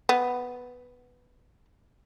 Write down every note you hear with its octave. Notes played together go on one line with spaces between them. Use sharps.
B3